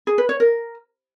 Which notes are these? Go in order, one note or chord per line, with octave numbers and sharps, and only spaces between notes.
G#4
B4
C#5
A#4